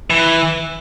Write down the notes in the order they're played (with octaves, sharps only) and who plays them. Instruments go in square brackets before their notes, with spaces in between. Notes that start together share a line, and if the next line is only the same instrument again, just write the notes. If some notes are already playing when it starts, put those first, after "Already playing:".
[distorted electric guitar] E3